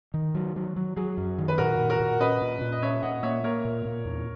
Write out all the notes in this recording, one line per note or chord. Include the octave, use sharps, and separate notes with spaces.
D#3
F#3
F#3
F#3
F#3 G#4
F#2
D#3
B4
A#2 F#4 A#4
A#2
F#4 A#4
A#2
C#4 B4 D#5
A#2
A#2
D#5
C#4 C#5 E5
A#2 D#5 F#5
A#3 C#5 E5
A#3 A#4 C#5
A#2
A#2
E2